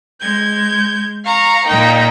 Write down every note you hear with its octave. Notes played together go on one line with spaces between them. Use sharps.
G#3 G6 G#6
F5 A#5 C#6
A#2 A#3 D#4 G5